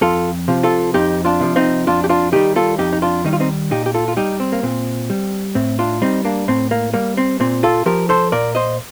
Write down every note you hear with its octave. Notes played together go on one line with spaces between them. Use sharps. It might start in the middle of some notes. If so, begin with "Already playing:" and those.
F2 F4 A4
C3 F3
F4 A4
F2 D#4 G4
D4 F4
C3 F3
C4 D#4
F2 D4 F4
G4
D4 F4
D#3 G3 D#4 G4
F4 A4
F2 D#4 G4
D#4
D4 F4
D#3 G3 D#4
F4
C4 D#4
A#2 D#4 G4
G4
F4 A4
F4
G3 D#4 G4
C4
A#3
A#2 C4
G3
A2 C4
D4 F4
G3 C4 D#4
A#3 D4
A2 C4
A#3
G3 A#3
C4
A#2 C4
F4 A4
F3 G4 A#4
A4 C5
A#2 A#4 D5
C5 D#5